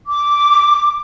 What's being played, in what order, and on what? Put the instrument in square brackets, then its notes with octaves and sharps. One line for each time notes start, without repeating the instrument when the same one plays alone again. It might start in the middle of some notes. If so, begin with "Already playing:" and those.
[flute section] D6